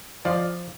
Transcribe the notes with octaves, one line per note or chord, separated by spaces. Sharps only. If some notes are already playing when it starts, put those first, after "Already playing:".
F3 D5 F5